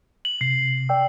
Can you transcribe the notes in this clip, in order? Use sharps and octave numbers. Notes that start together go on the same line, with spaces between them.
F#7
C3 C7
D5 G5 E6